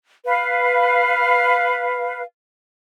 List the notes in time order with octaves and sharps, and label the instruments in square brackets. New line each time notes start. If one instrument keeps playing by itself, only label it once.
[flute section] B4 F5